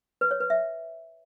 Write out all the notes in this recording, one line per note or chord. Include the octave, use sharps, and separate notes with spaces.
B4
C#5
B4
E5